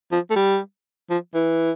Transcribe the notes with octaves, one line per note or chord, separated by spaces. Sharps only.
F3
A3
G3
F3
E3